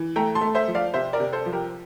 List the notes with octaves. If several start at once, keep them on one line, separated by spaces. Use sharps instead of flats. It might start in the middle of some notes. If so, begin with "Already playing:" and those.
Already playing: E3
A3 G5 A#5
A5 C6
A3
C5 E5
F3
D5 F5
C3 C5 E5
A#4 D5
C3
A4 C5
F3
G4 A#4